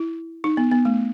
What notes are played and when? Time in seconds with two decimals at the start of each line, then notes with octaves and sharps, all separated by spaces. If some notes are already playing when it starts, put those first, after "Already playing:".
Already playing: E4
0.44 D#4
0.57 B3
0.71 B3
0.85 A3